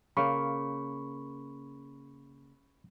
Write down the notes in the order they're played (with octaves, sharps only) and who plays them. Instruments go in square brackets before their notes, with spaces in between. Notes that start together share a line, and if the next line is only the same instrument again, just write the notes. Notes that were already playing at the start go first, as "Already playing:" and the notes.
[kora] C#3 A#3 [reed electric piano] B5 C#6